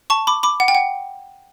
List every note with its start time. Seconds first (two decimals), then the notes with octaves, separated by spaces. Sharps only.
0.10 A5 C#6
0.27 B5 D6
0.43 B5 D6
0.60 F#5
0.68 G5
0.75 F#5